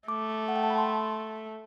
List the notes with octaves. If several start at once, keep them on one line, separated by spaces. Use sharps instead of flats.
A3 D6
F#5
G5
A5
B5
C6